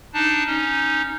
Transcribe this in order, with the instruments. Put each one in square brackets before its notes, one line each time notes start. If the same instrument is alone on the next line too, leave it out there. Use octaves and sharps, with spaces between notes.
[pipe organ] D4 D#4 A5
C#4 D#4